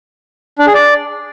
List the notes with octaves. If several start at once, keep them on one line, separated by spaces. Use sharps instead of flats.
D4
G#4
D5